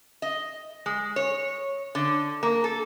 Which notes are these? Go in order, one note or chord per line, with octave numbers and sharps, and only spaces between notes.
D#5
G#3
C#5
D3
A#3
A4